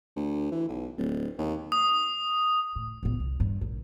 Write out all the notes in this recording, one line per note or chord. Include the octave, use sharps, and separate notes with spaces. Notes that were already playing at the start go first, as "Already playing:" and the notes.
D2
E3
B1
D1
D#2
D#6
A2
A#1 B3
C2
G2
A#1